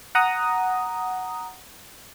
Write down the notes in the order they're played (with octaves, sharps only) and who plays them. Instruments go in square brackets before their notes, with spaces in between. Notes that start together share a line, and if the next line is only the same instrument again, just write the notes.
[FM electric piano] F#5 A#5 D#6